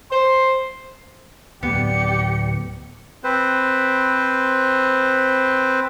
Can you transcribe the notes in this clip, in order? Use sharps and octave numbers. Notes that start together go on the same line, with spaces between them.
C5
D2 A2 B3 G4 D5 C#7
C4 B4 C5